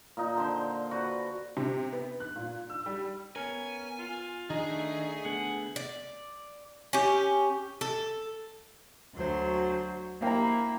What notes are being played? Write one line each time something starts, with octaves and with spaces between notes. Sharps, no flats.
A#2 D#4
D3 C5
F#4 B4 C5
C3
B3
F#6
A#2
E6
G3
B3 C#4 A#4 G#5
F4
D#3 D4 D#4 G#4
A3
D3 A3 B3 G#4 F#5
D5
C#4 G4
A4
D2 F#3 C5
A#3 E4 G5 A#5